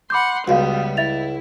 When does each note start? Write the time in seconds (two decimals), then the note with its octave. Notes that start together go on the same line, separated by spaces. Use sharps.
0.10 F#5 B5 C6 D6 G6
0.48 C#2 G3 B3 F#4 F5
0.97 E4 E5 A6 F7